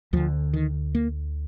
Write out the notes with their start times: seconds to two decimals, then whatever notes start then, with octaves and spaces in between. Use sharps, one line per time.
0.13 D2 D3 F3
0.53 D#3
0.95 A#3